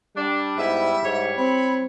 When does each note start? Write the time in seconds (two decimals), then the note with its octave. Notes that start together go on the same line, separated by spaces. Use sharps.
0.17 G3 D4
0.57 G#2 B3 E4 E5
1.03 G#2 E4 C#5
1.37 C4 B5